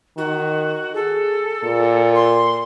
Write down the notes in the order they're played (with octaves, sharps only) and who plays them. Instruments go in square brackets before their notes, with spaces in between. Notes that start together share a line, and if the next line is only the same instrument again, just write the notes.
[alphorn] D#3 [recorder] F#4
[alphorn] G#4 [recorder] A4
[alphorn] A#2
[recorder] C6